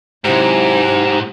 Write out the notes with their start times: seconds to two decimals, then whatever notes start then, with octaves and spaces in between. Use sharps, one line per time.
0.25 G#2 C3 F#3 E4 G4 C5 A#5 E6